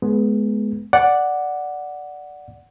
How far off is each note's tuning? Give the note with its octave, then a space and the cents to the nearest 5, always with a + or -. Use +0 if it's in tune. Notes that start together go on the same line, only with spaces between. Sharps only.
G#3 +25 B3 +0
D5 +0 F#5 +0